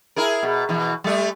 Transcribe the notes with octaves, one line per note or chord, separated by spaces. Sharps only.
E4 G#4 A#4
B2
B2 E3
G3 A3